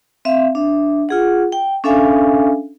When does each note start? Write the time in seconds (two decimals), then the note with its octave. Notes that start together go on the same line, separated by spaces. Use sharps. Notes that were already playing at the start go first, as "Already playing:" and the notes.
0.25 C4 E5 F5
0.55 D4 E5
1.09 F4 G#4 F#5
1.52 G5
1.84 C#4 D4 A4 E5 F5 G#5